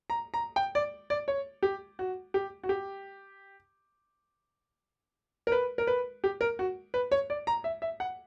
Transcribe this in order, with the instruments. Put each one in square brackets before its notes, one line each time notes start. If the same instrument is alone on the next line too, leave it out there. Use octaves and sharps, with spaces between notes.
[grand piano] A#5
A#5
G5
D5
D5
C#5
G4
F#4
G4
F#4
G4
A#4
B4
A#4
B4
G4
A#4
F#4
B4
C#5
D5
A#5
E5
E5
F#5